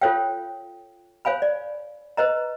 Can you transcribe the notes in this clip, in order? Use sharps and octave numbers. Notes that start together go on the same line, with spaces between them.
F4 A4 C5 C#5 F5 G5
C5 C#5 F5 G#5 B5
D5
B4 C5 D#5 A#5